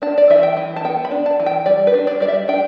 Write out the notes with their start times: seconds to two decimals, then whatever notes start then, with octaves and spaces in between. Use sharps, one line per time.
0.02 D4 A5
0.18 D5
0.30 E3 E5
0.43 G5
0.57 E3
0.76 A5
0.85 B3 G5
1.05 B5
1.11 D4
1.26 A5
1.40 E3
1.46 G5
1.66 G3 D5
1.87 B4
1.94 D4
2.07 D5
2.20 G3 D5
2.28 E5
2.48 D4 G5